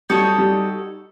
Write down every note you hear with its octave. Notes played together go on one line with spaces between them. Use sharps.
G3 D#4 F#4 A4 C#5
G3